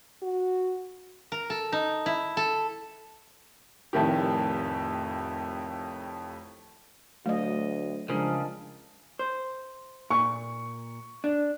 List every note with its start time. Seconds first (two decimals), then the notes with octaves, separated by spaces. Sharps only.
0.22 F#4
1.32 A#4
1.50 A4
1.72 D#4
2.06 E4
2.37 A4
3.93 F1 F2 A2 D#3 G4
7.26 D2 F#3 A3 D#5
8.09 C#2 C#3 F3 G#3 D4 A#4
9.19 C5
10.10 A#2 C#6
11.24 D4